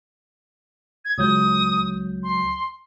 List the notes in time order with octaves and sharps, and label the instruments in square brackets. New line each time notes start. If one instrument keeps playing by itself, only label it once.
[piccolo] G#6
[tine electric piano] C#2 F#3 G6 [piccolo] D#6
[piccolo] C6